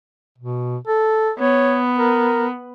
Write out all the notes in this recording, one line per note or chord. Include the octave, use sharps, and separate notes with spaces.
B2
A4
B3 C#5
A#4